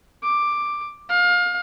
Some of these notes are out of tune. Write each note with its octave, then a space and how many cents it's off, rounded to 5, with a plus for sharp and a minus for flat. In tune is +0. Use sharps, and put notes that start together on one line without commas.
D6 +5
F5 +30